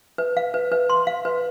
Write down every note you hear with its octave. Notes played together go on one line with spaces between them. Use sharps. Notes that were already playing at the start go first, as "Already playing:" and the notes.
B4
F5
B4
B4
C6
F5
B4